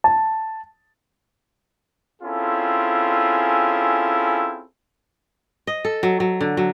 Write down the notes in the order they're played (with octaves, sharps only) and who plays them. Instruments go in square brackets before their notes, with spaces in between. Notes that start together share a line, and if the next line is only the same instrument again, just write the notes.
[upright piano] A5
[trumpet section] C4 C#4 E4 F4 G#4 A4
[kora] D#5
A4
F#3
F#3
D3
F#3